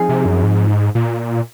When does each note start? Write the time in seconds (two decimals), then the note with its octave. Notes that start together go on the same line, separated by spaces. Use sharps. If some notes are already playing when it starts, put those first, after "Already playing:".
Already playing: F3 C4 D#4 G#4
0.09 C3
0.25 F#2
0.43 G#2
0.95 A#2